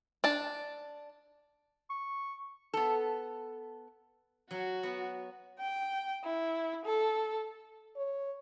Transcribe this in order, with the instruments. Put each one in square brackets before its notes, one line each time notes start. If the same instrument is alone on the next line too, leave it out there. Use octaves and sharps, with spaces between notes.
[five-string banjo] D4 A5
[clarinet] C#6
[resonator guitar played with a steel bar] B3 A4
[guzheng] F#3 [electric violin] F#4
[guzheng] B3
[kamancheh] G5
E4
A4
[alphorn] C#5